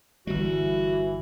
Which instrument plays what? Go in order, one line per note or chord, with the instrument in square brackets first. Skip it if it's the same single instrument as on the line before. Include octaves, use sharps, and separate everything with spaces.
[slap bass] G1 G3 [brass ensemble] E3 [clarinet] F#4